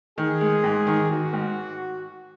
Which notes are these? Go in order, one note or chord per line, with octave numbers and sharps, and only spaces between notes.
D#3 G#4
G#3
G#2
D#3
D#3 F#4
G#2